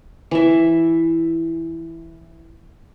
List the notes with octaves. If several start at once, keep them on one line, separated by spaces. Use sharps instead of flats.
E3 E5